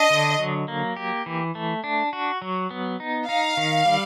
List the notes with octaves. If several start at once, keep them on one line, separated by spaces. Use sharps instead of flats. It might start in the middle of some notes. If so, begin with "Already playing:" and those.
Already playing: D4 D#5
D3
F#3
A#3
G4
E3
A3
D4
F#4
F#3
B3
D#4
D#4 F5
D#3
G3